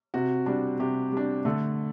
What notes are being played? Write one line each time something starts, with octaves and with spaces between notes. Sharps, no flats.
C3 F#4
G3 D4
C3 G4
G3 D4
D3 A3 A4